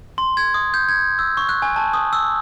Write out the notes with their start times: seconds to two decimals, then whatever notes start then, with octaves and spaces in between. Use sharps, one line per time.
0.18 C6
0.37 G#6
0.54 D#6
0.74 G6
0.89 G#6
1.19 E6
1.37 C#6
1.49 F#6
1.62 G#5
1.76 A5
1.94 D#6
2.13 E6